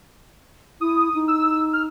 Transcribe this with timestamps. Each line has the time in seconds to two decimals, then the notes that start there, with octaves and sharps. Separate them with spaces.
0.81 E4 D#6
1.14 D#4
1.28 E6
1.73 F6